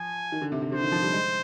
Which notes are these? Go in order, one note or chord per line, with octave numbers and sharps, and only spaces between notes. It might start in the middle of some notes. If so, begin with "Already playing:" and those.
Already playing: F3 G#5
D#3
D3
C3
C3
D3 C5
D#3
F3
G3
G#3